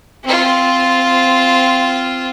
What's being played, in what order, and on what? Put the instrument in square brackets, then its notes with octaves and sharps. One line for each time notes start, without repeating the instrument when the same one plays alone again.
[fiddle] C4 F4